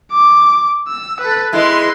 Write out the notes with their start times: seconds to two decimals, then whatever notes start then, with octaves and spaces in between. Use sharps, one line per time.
0.12 D6
0.88 E6
1.21 A4 B4
1.53 G#3 E4 B4 C6